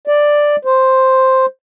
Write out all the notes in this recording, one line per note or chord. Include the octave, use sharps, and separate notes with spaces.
D5
C5